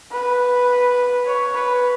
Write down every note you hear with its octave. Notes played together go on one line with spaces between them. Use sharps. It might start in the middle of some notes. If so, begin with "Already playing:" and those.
B4
C#5
B4